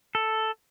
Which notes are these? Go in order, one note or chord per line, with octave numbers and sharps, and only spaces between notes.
A4